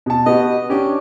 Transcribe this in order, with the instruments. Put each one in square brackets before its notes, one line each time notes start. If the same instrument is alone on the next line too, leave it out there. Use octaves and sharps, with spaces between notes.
[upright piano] B2 A5
[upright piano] B3 F#4 G4 [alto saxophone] D#5
[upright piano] C#4 D4 [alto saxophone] G4